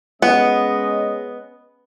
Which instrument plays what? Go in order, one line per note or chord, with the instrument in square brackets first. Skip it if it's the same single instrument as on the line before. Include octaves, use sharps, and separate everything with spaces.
[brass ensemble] G#3 C#4 D#5 [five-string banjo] B3